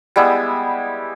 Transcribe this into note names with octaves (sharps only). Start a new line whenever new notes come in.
G3 G#3 B3 E4